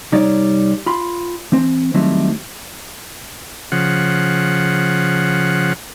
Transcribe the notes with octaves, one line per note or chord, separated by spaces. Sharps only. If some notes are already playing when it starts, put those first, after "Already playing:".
C2 G3 D#4 C#5 D5
F4 B5 C6
E3 C4 C5
D#3 F#3 G3 A3 C4 E4
C#3 F3 F#5